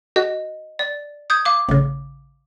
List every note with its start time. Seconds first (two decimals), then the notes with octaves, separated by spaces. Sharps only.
0.16 F#4 D#5
0.79 D5
1.30 D#6 G6 G#6
1.45 F5 D6
1.69 A1 C#3